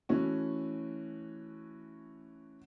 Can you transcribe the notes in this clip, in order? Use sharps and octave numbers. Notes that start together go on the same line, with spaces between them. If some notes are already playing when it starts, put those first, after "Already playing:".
E3 A3 C#4 F#4